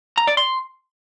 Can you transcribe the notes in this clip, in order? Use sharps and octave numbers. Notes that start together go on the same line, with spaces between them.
A#5
D5
C6